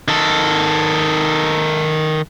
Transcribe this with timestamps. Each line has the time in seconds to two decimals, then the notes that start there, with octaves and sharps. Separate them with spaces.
0.08 D#3 A4